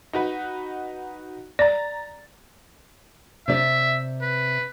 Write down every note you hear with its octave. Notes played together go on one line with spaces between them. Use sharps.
D#4 F#4 B4
D5 A#5 A6
C3 D5 E5
B4